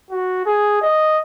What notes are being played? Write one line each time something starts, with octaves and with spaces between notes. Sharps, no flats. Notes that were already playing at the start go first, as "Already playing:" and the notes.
F#4
G#4
D#5